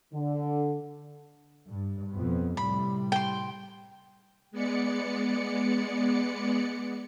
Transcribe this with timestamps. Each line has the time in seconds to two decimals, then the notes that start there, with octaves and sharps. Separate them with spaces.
0.14 D3
1.68 G2
2.12 F2 B2 B3
2.57 A2 C3 G3 B5
3.12 G5 C6
4.51 G#3 B3 D5 C#7